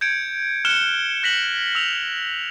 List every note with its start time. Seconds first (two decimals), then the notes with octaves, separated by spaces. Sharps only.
0.01 G6 G#6 C#7 D7
0.65 F6 F#6 C#7 E7 G7
1.23 F#6 A#6 B6 C#7 F#7
1.75 E6 F7